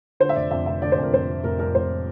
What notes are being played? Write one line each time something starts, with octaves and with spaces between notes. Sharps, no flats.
D3 C5
E5
F1 D5
F2 E5
F1 E5
D3 D5
C5
F2
A#4
F1 C5
F1
F1 A#4
F2 A#4
F1 C5